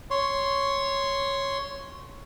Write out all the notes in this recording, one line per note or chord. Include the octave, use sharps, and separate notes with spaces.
C#5 C6